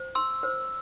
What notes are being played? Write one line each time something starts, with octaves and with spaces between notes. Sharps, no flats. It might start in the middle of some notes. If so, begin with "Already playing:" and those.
Already playing: C5
C6 E6
C5